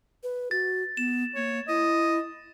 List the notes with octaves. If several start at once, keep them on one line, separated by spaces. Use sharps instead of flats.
B4
F#4 A6
B3 E7
A#3 C#5
E4 D#5